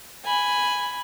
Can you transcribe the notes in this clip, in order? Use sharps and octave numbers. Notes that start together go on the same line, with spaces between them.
G#5 B5